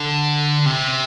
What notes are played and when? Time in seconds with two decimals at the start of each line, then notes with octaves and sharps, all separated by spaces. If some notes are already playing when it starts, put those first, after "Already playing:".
Already playing: D3
0.66 C3